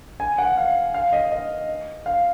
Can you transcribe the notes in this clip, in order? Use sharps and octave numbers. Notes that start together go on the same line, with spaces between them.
G#5
F#5
F5
F5
D#5
D#5
F5